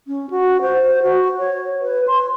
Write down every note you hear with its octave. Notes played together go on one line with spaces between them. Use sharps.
C#4
F#4
C5
F#4
C#5
B4
C6